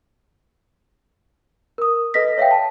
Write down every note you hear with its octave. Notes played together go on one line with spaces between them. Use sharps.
A#4 D#6
A4 B4 D#5 A#6 B6
C#5 E5 F5 G5
A5